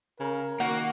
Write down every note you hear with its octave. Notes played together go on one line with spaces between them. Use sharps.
C#3 A#4
D#3 A#3 F#4